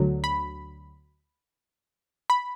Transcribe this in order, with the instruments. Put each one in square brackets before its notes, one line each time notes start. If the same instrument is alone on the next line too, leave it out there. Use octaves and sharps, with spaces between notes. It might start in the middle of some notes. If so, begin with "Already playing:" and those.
Already playing: [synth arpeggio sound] D2 D3 F#3
B5
B5